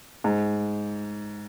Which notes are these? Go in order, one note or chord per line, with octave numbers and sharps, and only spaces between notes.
G#2